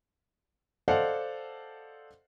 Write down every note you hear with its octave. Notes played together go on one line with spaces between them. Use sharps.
A4 C5 D5 D#5 F5 F#5